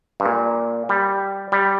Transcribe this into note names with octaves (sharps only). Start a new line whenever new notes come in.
G2
A#2
G3
G3